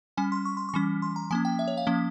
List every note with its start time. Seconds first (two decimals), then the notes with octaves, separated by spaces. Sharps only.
0.17 G3 C#4 G#5
0.32 C6
0.45 C#6
0.57 C6
0.69 C#6
0.74 E3 G3 C#4
1.02 C6
1.16 A#5
1.31 F3 A#3 C#4 G#5
1.45 G5
1.59 E5
1.68 C#5
1.77 F5
1.87 F3 A#3 C#4